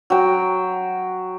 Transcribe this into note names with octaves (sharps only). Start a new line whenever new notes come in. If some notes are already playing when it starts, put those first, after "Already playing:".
F#3 G5